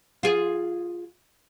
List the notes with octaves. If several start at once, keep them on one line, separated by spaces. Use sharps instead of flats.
F4 G#4